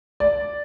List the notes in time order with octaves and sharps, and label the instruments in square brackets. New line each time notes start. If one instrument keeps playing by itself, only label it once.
[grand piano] D5